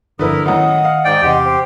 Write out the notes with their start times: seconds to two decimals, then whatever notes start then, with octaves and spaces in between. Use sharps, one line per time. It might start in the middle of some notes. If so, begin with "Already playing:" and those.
0.19 G1 F2 D3 A3 E4 A#4 B4 D#6
0.46 F#2 A2 D#3 D#5 F#5 D#6
0.85 F5
1.05 G#2 D5 G5
1.22 E2 C3 G4 D#5 F#5 C6
1.45 C5 G5